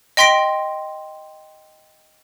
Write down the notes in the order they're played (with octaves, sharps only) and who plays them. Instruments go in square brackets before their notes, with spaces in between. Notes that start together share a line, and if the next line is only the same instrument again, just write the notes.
[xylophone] D#5 G5 C6 A#6 B6 D7